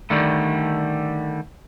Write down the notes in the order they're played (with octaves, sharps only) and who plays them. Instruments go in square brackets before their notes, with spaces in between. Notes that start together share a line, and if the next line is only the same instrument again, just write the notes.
[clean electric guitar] D3 D#3 G3 A3